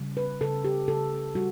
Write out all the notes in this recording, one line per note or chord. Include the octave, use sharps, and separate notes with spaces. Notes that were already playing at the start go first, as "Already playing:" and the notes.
Already playing: C#3 G3
B4
C#3 A4
G4
C#3 A4
G3 F#4